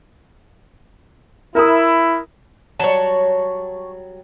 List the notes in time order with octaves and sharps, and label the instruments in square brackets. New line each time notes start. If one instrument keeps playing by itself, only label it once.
[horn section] E4 [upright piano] A#4 D#6
[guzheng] F#3 G3 [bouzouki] C#5 A5